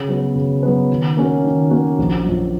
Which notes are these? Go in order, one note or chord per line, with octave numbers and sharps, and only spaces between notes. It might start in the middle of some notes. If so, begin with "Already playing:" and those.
Already playing: C#3
F#3 B3 F#4 B4
C#3
F#3 B3 F#4 B4
D#3
A#3 C#4 F#4
D#3
A#3 C#4 F#4
A#1
A#2 F#3